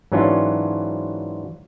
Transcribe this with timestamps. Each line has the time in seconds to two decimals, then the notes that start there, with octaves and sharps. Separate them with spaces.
0.12 G#2 E3 F#3 C#4 D4 F4